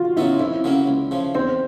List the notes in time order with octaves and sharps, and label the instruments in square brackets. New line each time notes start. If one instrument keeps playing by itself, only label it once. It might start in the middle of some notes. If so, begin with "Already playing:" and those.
Already playing: [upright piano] F4 F#4
[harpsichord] C#3 F#3 B3 D#4 [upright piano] E4
[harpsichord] F2 [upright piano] E4
[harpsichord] C#3 F#3 A#3 C#4
C#2
C#3 F3
[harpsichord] E2 [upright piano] C4